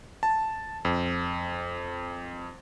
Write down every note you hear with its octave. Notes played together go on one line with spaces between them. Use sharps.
A5
F2